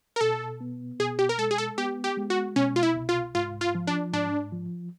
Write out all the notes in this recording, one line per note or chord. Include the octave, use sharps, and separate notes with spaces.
A#4
B2 A4
B3
B2 G#4
G4
A#4
G#3 A4
G#4
A4
B3 G4
G4
G#3
F#4
B2 C#4
F4
E4
C2
F4
G#2 F4
F4
F3
D4
G#2 D4
F3